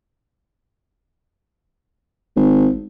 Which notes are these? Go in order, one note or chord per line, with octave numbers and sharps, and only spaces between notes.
G#1